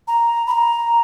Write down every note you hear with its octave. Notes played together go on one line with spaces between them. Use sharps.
A#5
B5
A#5